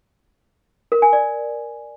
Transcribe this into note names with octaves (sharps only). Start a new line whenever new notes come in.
A#4
G#5
D5